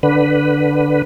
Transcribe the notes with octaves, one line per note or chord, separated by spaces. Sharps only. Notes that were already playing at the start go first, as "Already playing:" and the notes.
D3 B4